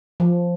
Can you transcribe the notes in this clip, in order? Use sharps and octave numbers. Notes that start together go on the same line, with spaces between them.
F3